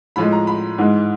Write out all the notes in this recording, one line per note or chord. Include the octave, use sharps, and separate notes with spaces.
A2 F3 G#3 B5
A#5
B5
G#2 E3 G#3